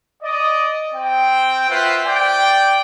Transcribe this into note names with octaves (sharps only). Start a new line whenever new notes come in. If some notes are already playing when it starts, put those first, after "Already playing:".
D5 D#5
C4 G5
F4 F#4 B4 C5 E5
D5 G5